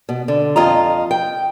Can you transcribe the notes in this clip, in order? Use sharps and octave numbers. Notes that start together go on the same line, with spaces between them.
B2
D3
F2 F4 D#5 A#5
G5